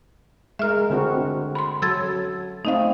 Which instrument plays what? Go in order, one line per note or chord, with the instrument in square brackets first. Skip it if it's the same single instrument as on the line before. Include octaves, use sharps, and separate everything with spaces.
[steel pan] G#3 A#4 [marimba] E5 F6
[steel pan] D3 C4 F#4
[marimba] B5 C6
[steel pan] F#3 A4 [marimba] E6 G#6 A6
[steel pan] A3 C4 [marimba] D#4 D#5 F5